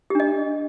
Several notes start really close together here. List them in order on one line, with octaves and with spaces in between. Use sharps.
G4 D4 D#5